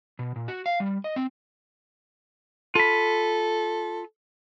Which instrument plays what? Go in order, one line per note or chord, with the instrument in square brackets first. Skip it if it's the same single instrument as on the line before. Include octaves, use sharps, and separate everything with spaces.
[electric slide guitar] B2
A#2
F#4
F5
G3
D#5
C4
[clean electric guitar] F4 B5 [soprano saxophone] A4